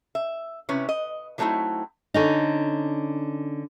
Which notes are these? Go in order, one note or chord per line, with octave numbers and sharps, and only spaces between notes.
E5
C3 C#4 E4 B4 C#5
D#5
E3 F#3 A3 C4 D#4 E4
D3 C#4 D#4